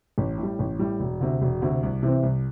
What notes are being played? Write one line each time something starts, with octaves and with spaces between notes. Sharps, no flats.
A1
A2
G3
A1
A2 G3
E1
D2 C3
E1
D2 C3
C2
C3 E3 C4
C2